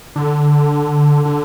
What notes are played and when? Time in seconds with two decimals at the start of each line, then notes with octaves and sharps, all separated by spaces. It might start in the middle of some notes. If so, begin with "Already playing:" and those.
0.16 D3
1.25 D3